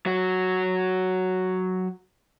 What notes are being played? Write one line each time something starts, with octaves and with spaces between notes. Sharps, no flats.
F#3 F#4